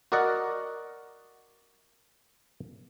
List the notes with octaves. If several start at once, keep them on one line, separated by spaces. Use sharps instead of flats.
F#4 A#4 D5 D#5 F#5